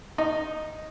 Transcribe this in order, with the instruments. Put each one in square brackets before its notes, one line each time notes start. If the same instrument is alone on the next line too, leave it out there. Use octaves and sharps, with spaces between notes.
[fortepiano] D#4